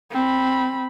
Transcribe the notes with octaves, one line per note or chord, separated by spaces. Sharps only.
C4 B5